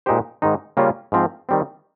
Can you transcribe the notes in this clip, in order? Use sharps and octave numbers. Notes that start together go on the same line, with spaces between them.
A#2 G#3 D#4 G4 C5
G#2 D#3 G#3 D#4
C#3 G3 A#3 C#4 F4
G#2 F3 C4
D#3 G3 C4